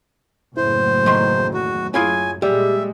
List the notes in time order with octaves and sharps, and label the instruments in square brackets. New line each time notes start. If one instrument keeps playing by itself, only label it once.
[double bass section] F#1 E2 A2 [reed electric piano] E4 [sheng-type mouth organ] C5
[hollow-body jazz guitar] D#3 F#3 C6
[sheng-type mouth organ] F#4
[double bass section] F#2 [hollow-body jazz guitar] E4 F4 G#4 [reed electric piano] C#5 G#6 [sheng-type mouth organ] G#5
[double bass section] A#2 G#3 [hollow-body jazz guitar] G3 [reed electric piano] G4 D5 [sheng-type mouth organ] E5